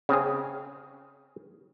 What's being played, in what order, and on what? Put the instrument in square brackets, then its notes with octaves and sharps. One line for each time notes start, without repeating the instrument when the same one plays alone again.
[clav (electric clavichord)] C#3 C4 G#4